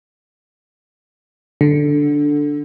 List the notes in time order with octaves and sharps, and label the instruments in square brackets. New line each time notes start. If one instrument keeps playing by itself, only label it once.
[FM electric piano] D3